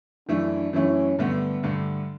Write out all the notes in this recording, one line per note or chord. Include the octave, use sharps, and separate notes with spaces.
F#2 E3 A3 D4 E4
F#2 E3 A3 C#4 E4
G2 D3 A3 B3
G2 D3 A3